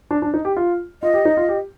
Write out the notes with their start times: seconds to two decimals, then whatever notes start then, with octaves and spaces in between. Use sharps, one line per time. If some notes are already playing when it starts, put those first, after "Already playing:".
0.11 D4
0.22 D4
0.34 D#4
0.45 G4
0.57 F4
1.02 F4 D#5
1.14 G4
1.25 D#4
1.37 F4
1.49 G4